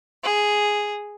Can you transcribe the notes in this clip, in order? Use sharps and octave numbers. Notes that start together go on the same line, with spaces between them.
G#4